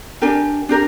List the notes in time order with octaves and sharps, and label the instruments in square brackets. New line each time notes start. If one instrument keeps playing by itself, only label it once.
[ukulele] D4 G4 A#4 G#5
D4 G4 A#4